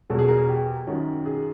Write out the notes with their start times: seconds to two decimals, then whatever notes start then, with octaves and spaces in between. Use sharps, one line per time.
0.10 E2 B2 F#3 A4
0.19 G#4
0.28 A#4
0.38 G#4
0.49 G4
0.87 F#2 D#3 F#3
1.26 G#4